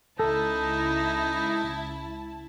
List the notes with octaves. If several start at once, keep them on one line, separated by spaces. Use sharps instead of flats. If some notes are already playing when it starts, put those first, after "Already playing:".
C#2 D#4 E4 A4 A5